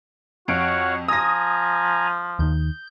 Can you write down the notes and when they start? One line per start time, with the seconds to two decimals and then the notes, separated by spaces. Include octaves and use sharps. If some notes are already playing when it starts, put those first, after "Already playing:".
0.48 F2 F#4 C#5 F5 F#5 D7
1.08 F3 G#5 A#5 D#6 A#6
2.39 D#2 D#3 G6